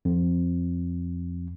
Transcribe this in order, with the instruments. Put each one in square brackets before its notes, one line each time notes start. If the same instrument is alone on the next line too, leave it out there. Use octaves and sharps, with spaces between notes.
[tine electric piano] F2